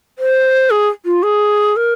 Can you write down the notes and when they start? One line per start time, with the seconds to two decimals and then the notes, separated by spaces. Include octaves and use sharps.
0.19 C5
0.70 G#4
1.05 F4
1.23 G#4
1.76 A#4